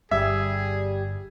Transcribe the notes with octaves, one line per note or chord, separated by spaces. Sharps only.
G1 G3 G#4 E5